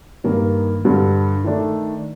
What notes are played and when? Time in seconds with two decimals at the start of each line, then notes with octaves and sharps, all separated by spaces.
0.24 G2 D#3 A#3
0.85 G2 D3 G3 D4 A4
1.44 D#3 A3 D4 A4